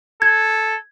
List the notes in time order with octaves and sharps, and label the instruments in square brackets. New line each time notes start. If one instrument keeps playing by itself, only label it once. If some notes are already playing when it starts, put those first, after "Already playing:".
[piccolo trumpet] A4 [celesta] G#6